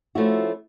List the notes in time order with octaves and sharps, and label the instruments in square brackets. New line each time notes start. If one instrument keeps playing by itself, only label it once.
[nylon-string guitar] F3 A3 C#4 E4 F#4